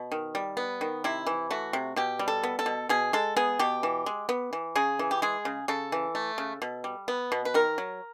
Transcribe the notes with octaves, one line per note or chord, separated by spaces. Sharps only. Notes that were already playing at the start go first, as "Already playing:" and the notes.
Already playing: B2
D#3
G3
B3
D#3
C3 E4
E3
A3 F#4
C3
B2 G4
G3
A4
B3
A4
B2
B2 G#4
G#3 A4
B3 G#4
B2 G4
E3
G#3
B3
E3
C#3 G#4
E3
G4
G#3 G#4
C#3
C#3 A4
E3
A3
C#3
B2
G3
B3
B2
B4
D#3 A#4
F#3